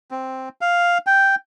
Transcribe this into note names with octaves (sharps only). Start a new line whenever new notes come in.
C4
F5
G5